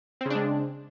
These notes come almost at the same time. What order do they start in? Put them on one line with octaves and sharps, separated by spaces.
C4 C#3 D4 G#3